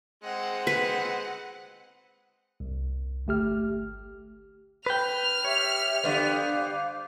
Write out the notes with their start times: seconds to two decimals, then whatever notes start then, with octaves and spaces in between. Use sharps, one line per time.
0.23 G#3 C4 F#5
0.67 B4
2.60 C2
3.27 G1 A3 G4 F6
4.86 B4 G5 F6
5.45 G4 C#5 E5
6.04 D3 G3 B3 C5 F5 D6